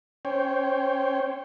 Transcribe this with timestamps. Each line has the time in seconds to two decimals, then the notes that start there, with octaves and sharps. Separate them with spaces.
0.25 C#4 C5 C#5 G5